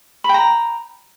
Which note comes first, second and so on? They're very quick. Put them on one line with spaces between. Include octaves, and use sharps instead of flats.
B5 G5 A#5